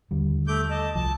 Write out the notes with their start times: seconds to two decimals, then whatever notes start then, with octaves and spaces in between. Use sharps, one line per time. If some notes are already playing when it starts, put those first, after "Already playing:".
0.11 D#2 D3 G3
0.48 A3 D6 G6
0.70 D#5 A5
0.95 C2 F3 A5